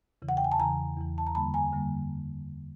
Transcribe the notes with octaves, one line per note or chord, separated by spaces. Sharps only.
E2 C#3 E3
F#5
G5
G#5
A5
E2 C#3 E3 G#5 A#5
E2 C#3 E3
A5
A#5
F#2 D3 G3 A#3 A5 B5
G#5 A#5
F#2 D3 G3 A#3